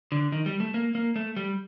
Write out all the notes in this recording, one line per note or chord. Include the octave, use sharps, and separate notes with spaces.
D3
D#3
G3
A3
A#3
A#3
A3
G3